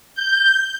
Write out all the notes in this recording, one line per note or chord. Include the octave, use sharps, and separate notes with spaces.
G6